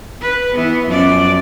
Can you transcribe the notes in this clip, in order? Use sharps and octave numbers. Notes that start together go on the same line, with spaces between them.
B4
E3 B3
F#2 F3 D5